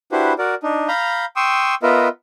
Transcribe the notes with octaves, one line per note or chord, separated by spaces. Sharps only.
D4 E4 F#4 G4 B4 C5
F#4 A#4 D5
D4 D#4
F5 A#5 B5 G6
G5 C6 C#6 D#6 E6
B3 F4 A#4 B4 D#5 E5